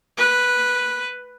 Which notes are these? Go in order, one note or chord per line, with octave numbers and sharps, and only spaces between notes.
B4